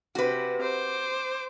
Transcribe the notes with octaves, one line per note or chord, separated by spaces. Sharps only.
C3 F#4 B4
C5 D6